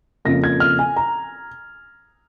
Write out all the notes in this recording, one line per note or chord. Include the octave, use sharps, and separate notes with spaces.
F2 C#3 F3 A#3 A#6
G#6
F6
G#5
A#5